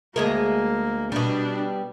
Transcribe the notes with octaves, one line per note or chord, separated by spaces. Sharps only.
D2 G#3 A#3 A#4
B2 G3 D4